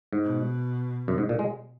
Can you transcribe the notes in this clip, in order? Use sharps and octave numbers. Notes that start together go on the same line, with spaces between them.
G#2
B2
F#2
G#2
A#2
G#3